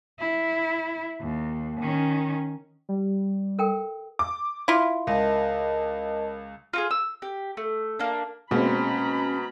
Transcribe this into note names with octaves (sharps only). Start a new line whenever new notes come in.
E4
D#2
D#3 C#4
G3
A4 A#4 G5
D6
E4 F4
C#2 A#4 D#5 A5
F4 F#4 G#4
E6
G4
A3
A#3 D4
B2 G#3 A#3 C4 C#4 F#5 A#5 B5